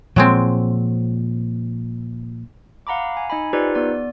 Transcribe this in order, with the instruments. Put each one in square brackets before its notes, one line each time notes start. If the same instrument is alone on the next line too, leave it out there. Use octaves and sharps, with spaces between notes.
[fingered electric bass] A#2 F3 [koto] F#3 G#3 C4
[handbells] F5 F#5 A#5 B5 D6
G#5
D#4 D#5 G#5 B5
D#4 F4 G4 B4 C5 D5
B3 D5